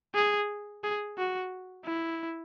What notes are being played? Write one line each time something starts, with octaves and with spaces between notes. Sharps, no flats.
G#4
G#4
F#4
E4